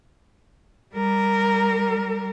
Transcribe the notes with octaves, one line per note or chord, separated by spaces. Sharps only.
G3 A#4